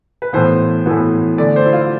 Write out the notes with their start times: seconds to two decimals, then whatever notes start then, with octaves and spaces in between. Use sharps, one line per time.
0.22 B4
0.33 A2 E3 B3 C5
0.86 A2 E3 B3
1.38 D3 A3 D5
1.56 C5
1.66 E4
1.73 F4